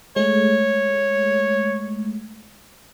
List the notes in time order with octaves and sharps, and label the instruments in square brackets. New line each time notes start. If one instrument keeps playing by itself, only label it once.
[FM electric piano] G#3 A3 [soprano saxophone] C#5